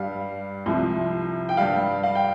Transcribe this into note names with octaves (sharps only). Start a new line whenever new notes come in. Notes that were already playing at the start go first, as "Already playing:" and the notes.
Already playing: G2 G3 F5
C2 C3 F3
G5
G2 G3 F5
F5
G5